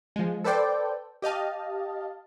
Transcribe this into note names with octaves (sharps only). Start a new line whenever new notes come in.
F3 G#3
A4 B4 C5 D5 G5
G4 D#5 F5 A5